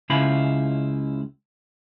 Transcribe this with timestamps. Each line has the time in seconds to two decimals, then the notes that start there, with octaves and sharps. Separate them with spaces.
0.10 C#2 C#3 E4 F4 B5